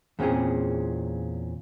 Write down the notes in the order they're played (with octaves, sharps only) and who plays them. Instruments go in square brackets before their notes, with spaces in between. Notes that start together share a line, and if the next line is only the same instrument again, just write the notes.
[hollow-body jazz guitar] E2 A#2 C4 C#4 G#4